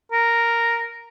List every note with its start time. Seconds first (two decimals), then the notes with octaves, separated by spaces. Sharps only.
0.12 A#4